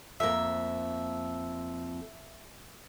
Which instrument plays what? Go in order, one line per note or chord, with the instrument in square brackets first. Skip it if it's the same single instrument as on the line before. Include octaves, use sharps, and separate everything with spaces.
[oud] F2 A#3 [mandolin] E5